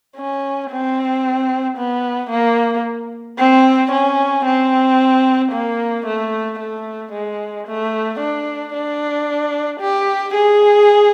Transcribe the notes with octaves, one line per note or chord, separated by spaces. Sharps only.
C#4
C4
B3
A#3
C4
C#4
C4
A#3
A3
A3
G#3
A3
D4
D4
G4
G#4